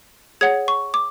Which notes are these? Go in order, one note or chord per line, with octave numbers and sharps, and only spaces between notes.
G#4 C#5 F#5 G#6
C#6
D6